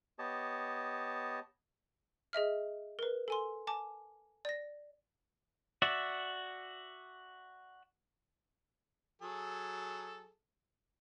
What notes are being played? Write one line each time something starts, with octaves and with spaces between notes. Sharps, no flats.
B3 G4 C#5 D#5 A5
G#4 D#5 E5 F6
A#4 B4
A4 G#5 C6
G#5 A5 D6
D5 A#6
F#4 D5 E5
F#3 G#4 A4